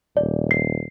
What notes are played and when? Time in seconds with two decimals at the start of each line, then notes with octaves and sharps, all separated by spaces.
0.17 D#1 D5
0.51 C7